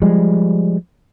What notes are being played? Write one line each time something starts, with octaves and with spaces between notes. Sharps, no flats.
F3 G3 G#3